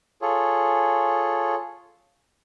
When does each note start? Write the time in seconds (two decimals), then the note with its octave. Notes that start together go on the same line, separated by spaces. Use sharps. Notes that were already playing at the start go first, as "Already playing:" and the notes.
0.22 F4 G#4 A4 C#5